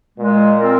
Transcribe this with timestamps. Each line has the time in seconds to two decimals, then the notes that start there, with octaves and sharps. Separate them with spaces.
0.17 A#2 G#3
0.58 C4 F4 A#4